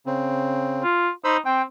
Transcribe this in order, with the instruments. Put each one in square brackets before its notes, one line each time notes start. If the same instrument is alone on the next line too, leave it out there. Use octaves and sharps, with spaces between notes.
[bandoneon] C#3 C4
[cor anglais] F4
[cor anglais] D#4 [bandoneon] C5 B5 E6
[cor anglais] C4 [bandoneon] G5